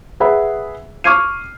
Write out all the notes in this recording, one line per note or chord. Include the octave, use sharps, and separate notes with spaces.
G#4 B4 E5 F#5 B5
C#6 D6 F6 G#6 C7 D#7